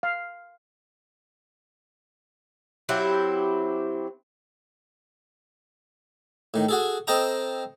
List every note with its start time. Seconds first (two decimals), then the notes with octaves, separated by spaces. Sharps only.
0.03 F5
2.89 F#3 C4 E4 G4
6.54 A2 D#3
6.69 F#4 G#4 A4
7.07 C4 A4 D#5 G5 A#5 D#6